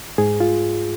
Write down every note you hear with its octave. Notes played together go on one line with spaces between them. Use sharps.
G#2 G#4
F4